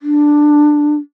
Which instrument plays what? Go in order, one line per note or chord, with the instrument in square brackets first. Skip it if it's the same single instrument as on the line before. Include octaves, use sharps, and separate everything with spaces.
[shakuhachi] D4